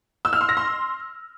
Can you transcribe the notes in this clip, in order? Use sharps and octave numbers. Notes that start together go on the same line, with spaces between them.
E6
F6
C6
A#6
C6